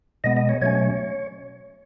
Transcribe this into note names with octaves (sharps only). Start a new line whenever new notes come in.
B2 G#3 B3 D#5
D#5
C#5
B2 F#3 A3 C#4 C#5